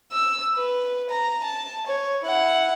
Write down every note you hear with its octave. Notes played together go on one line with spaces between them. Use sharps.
E6
B4
A#5
A5
C#5
E4 F#5